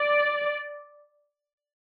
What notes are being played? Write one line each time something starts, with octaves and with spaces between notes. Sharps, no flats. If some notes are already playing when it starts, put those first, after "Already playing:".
Already playing: D5